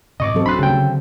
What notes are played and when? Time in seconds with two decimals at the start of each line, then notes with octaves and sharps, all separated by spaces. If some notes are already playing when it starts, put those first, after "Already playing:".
0.20 G#2 C3 D#5 C#6 D6
0.34 G#2 E3 F#3 C4 A4
0.46 D#1 D4 B5 C6 F#6
0.59 D2 G2 C#3 G5
0.77 D3